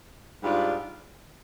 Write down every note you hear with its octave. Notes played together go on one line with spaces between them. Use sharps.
G#2 G3 D4 F4